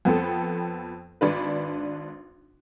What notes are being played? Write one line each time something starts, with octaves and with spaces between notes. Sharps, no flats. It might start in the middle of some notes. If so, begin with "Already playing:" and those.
F2 B3 C4 A4 G5
G#1 D4 B4